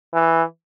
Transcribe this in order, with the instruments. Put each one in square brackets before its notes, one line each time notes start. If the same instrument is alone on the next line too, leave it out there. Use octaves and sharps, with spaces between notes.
[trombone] E3